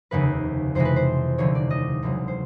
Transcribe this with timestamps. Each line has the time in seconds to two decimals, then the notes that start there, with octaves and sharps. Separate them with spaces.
0.11 F1 D#2 C#3 B4
0.75 F2 C3 E3 G#3 C5
0.85 B4
0.96 C5
1.38 F1 D#2 D3 F3 C#5
1.55 D5
1.70 D#5
2.02 E1 D2 C#3 F#3
2.28 C5